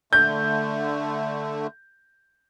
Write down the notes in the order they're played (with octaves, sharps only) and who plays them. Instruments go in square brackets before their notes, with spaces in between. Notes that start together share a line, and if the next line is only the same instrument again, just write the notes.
[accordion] D3 A3 [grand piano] G6